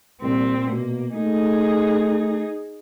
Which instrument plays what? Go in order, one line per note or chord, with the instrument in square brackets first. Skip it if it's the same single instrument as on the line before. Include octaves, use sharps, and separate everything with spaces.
[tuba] C2 [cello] A#2 C4
[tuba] B2 [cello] A#3
[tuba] A3 [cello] D#4 G#4